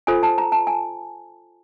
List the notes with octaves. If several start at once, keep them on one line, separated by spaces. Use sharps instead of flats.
F4 A4 C5 G#5
A5
A#5
A5
G#5